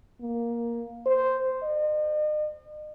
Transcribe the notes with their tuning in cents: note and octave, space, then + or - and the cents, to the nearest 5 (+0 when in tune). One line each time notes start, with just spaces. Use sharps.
A#3 +10
C5 -5
D#5 -40